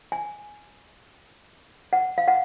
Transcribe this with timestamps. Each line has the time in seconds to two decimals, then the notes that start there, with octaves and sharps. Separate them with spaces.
0.12 G#5
1.93 F#5
2.18 F5
2.28 F#5